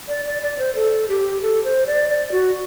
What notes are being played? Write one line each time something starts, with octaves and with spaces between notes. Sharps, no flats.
D5
D5
D5
C5
A4
G4
A4
C5
D5
D5
F#4